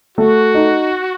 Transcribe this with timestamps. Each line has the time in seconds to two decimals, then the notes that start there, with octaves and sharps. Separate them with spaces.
0.18 A3 F#4
0.55 D#4